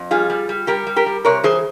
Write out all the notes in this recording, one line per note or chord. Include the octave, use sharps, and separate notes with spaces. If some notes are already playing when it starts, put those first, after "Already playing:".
Already playing: F2
G3 F4 G#4
G3
G3
G3 G4 A#4
G3
G4 A#4
G3
C3 A#4 C#5
E3 G#4 C5